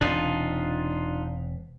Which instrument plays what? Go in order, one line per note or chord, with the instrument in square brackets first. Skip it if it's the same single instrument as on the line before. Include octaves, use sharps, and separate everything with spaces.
[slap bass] E1 C3 [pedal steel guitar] D4 D#4 F4